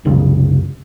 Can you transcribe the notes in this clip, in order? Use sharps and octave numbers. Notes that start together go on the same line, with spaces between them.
C2 F#2 C#3